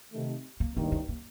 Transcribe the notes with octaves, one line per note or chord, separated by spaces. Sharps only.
C3 D#3 A3
A#3
A1 G2 D#3 A#3
A3
A#3